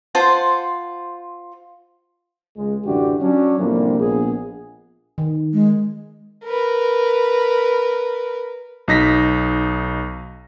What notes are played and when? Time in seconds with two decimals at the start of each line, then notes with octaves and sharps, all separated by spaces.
0.15 F4 C5 F#5 A5
2.57 C#2 G#3
2.86 A1 F#2 D3 D4 F#4 G4
3.22 F#3 C#4 D4
3.59 A2 C3 F3 G3 A#3 D4
3.99 A#1 B3 G#4
5.18 D#3
5.53 G#3
6.45 A#4 B4
8.88 B1 D#4 A#6 B6